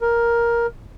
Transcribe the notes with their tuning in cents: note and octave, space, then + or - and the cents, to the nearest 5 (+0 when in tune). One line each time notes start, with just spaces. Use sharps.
A#4 +10